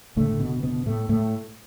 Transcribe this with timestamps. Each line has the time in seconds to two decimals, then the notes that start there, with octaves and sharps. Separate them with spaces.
0.16 F#1 F#2 A2 D3 A3
0.40 B2 B3
0.63 B2 B3
0.86 A2 A3
1.09 A2 A3